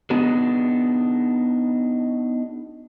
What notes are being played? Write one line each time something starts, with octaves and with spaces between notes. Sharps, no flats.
B3 D4 D#4 F#4 G#4